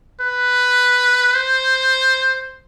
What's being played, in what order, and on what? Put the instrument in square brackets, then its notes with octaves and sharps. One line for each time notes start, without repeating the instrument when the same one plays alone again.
[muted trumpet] B4
C5